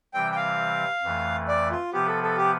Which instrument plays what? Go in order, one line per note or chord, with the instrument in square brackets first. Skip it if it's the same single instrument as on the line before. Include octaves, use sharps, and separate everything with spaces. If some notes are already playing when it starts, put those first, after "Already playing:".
[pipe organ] C3 E3 G3 C4 [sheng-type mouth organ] G5
[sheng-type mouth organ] G5
F5
[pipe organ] F2 E3 A3
[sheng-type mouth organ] D5
F4
[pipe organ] C3 F3 B3 [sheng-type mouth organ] G4
[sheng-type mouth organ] A4
A4
G4